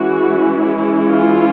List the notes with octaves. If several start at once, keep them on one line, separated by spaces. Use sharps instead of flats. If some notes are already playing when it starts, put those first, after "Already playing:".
Already playing: E3 G#3 C#4 E4 F#4
F4